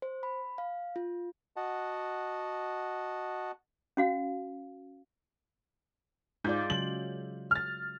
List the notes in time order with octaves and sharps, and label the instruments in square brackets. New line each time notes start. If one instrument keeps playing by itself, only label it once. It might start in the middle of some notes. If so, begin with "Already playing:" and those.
[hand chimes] C5
B5
F5
F4
[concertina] F#4 D#5 F#5 A5
[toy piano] C#4 F#4 F5
[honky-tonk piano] G#2 G6 [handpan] G#3 F4 D5
[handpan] C#3 F#3 [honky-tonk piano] F#7
[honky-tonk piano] F6 A6